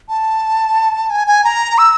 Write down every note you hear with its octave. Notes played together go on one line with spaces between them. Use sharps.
A5
G#5
G#5
A#5
E6